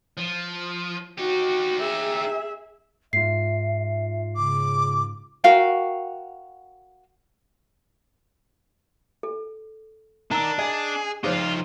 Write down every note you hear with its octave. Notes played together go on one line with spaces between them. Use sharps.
F3
D#4 F#4 G4
G#4 E5
G#2 F4 E5 C7
C#3 D6
F#4 A#4 F5 G5
A4
D4 D#4 A#4 A#5 E6
G#4 D#5 G#5
F3 D#4 F4 G#4 C5 C#5